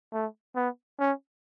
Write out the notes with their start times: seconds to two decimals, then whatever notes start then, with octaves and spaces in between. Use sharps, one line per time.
0.13 A3
0.56 B3
0.99 C#4